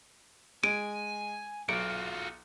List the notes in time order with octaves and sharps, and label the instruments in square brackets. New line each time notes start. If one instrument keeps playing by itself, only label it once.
[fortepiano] G#3 [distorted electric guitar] G#5 [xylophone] D7 D#7
[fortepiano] B1 [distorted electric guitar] F4 F#4 [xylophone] D7